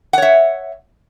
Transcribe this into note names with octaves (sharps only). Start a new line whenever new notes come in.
C#5 E5 F#5